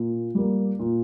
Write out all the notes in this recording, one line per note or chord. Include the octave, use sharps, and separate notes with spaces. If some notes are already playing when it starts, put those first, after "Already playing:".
Already playing: A#2
G3 A#3
A#2